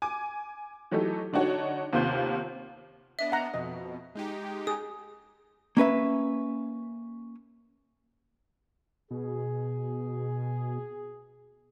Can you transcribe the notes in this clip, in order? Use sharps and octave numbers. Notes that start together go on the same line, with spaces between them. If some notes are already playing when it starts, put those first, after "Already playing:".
G#5 D6
E3 F#3 A3 D#4 G4 A4
D3 D4 D#4 F#4 C#5
D#2 C3 B3 F4 C6 G6
B3 D4 D#5 E5
F#5 A#5
F2 B2 D#5
G#3 D#4 G4
G#4 D#6
A#3 C#4 B4 E5
B2 G#4